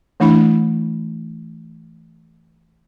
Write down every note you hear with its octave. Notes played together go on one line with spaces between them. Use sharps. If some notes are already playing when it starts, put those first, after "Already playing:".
E3 A3 D4 E4 B5